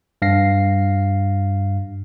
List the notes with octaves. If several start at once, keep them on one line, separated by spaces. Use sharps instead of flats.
G2 F5 A#6 C7